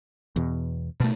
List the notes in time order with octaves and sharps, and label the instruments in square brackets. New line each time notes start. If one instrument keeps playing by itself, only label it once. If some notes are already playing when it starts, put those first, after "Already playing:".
[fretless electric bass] E2 B2
[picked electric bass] B2 A3